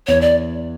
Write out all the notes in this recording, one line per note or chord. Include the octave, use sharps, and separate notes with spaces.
E2 C#5
D5